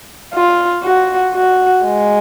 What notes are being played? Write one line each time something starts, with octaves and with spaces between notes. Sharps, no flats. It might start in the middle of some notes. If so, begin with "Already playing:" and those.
F4
F#4
F#4
G#3